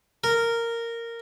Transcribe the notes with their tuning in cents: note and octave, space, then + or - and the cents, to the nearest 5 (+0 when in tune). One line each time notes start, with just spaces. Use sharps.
A#4 -10